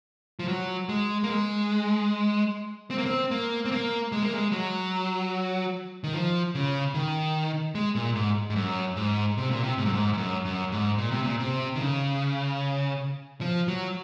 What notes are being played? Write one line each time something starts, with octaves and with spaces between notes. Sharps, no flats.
F3
F#3
G#3
A#3
G#3
C4
A#3
C4
A#3
C4
A#3
G#3
A#3
G#3
F#3
D#3
F3
C#3
D#3
G#3
A#2
G#2
G#2
F#2
G#2
C3
A#2
C3
G#2
F#2
G#2
G#2
F#2
F#2
G#2
A#2
C3
A#2
C3
D#3
C#3
F3
F#3